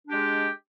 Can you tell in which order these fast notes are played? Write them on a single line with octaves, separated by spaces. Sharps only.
D4 G4 G#3